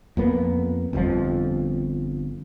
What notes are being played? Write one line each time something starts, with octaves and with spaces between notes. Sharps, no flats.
F2 A#3 B3
G1 F2 A#2 F3